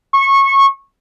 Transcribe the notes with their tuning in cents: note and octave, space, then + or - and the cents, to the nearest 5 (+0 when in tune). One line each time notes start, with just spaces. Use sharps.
C#6 -20